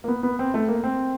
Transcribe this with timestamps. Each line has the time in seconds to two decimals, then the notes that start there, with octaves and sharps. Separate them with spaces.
0.04 A#3
0.08 B3
0.23 B3
0.39 C4
0.54 A3
0.68 A#3
0.84 C4